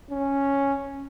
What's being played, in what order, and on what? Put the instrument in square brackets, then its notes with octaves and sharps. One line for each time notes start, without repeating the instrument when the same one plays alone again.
[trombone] C#4